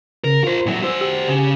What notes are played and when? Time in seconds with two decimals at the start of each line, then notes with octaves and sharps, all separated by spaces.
0.24 C#3 A#4
0.44 F4 A#4 C5
0.66 A#2 F#3 E4
0.82 F#4 C5 E6
1.01 G4
1.28 C#3